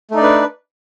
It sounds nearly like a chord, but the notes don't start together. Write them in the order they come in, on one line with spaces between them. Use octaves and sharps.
A3 D#4 D5 D4 B4